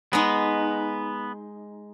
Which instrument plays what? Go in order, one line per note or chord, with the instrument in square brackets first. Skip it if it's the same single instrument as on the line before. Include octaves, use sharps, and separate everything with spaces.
[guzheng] G#3 D#4 [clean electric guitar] B3